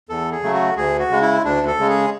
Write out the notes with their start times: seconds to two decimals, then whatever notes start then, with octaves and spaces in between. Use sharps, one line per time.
0.09 E2 A4
0.32 G#4
0.43 C#3 F#3 A3
0.54 F#4
0.76 D2 G#4
0.99 F#4
1.11 C#3 G#3
1.22 E4
1.44 D2 D4
1.67 A4
1.78 C#3 G#3
1.90 G#4